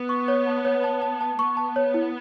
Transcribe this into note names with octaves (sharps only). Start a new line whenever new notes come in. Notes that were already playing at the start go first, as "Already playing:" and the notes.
Already playing: B3
C#6
C#5
A5
C#5
A5
A5
A5
B3 C#6
A5
C#5
E4